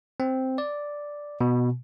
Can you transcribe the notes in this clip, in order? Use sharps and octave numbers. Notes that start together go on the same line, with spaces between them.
C4
D5
B2